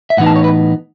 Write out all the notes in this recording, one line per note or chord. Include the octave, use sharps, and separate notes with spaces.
E5
A2 E3 B3 D#4 F#5
A5
C#5
B4